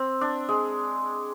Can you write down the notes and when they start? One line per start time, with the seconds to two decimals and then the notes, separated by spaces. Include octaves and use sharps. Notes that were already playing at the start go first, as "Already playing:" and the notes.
Already playing: C4
0.21 D4
0.49 G#3